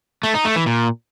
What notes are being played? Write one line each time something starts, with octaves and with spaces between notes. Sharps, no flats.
A3
D#4
A3
E3
A#2